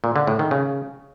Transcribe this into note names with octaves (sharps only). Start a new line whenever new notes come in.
A#2
D3
A2
D#3
C#3